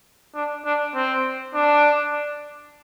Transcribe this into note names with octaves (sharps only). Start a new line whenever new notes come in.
D4
D4
C4
D4